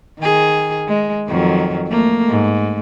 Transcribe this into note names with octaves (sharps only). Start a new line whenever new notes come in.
D#3 G#4
G#3
F2 D#3 F#3
A3 A#3
G#2